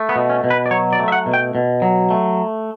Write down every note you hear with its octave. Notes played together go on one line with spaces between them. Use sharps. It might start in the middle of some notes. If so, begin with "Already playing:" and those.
Already playing: A3
B3
B2
C#4
B2
B4
D5
F#3 C#5
D5
A3
E5
F#5
B2
G5
B2
F#3
A3